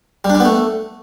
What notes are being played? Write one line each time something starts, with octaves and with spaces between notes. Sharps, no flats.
G3
D4
G3
B3
A3